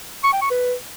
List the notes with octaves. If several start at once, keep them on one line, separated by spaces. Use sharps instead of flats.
C#6
G5
C#6
B4